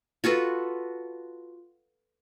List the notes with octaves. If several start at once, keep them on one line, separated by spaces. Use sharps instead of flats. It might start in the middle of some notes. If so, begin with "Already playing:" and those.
F4 F#4 A4 B4